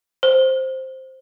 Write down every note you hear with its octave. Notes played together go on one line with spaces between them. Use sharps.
C5